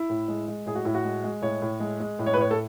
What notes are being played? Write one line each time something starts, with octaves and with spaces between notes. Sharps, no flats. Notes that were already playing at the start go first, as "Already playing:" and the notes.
Already playing: E4
A2
G#3
G#3
A2 G#4
F#4
A2 E4
F#4
G#3
G#3
A2 C#5
A2
G#3
G#3
A2
C#5
B4
A2 C#5
A4